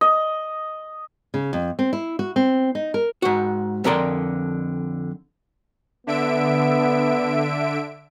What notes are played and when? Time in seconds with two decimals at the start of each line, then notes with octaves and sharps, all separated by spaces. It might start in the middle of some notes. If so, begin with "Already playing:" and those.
0.01 D#5
1.34 C#3
1.53 F2
1.79 C4
1.93 E4
2.19 F#4
2.36 C4
2.75 D#4
2.94 A#4
3.22 G#2 F#4
3.84 F2 D3 A#4 D5 C6
6.07 D3 B3 E5 D7